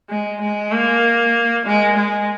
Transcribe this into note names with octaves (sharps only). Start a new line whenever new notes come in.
G#3
G#3
A#3
G#3
G#3